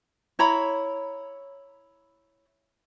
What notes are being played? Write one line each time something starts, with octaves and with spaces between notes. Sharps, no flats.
E4 C#5 A#5 B5